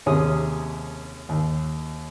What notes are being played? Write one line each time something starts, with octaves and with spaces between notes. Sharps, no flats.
D#2 C3 C#4 G#4 D#6
D#2